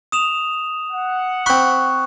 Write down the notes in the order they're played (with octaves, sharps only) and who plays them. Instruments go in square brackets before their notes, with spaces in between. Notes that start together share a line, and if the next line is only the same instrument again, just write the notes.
[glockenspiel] D#6 E7 F7
[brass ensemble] F#5
[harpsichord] C4 B5 [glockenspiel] C#6 F#6